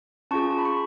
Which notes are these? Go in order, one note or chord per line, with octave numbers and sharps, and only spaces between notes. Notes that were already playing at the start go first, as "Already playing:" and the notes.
C#4 F4 G#4 A5 C#6
A5
B5
C#6